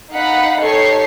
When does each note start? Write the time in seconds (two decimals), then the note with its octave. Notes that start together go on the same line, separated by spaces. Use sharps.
0.13 D#4 F5 F#5 B5
0.61 D#4 G4 A4 C#5 C#6 C7